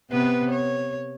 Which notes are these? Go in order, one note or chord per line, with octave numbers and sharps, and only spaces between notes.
C3 B3 B4
C#5